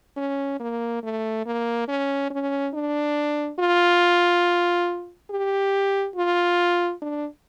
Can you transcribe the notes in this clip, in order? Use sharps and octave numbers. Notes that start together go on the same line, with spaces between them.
C#4
A#3
A3
A#3
C#4
C#4
D4
F4
G4
F4
D4